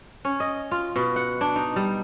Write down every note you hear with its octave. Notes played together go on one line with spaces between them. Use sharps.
C#4
D#5
F4
B2
F#5
D4
D#4
G3